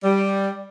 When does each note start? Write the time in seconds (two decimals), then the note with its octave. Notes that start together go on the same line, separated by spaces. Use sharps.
0.04 G3